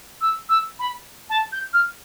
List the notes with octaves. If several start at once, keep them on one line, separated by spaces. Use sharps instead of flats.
E6
E6
B5
A5
G6
F6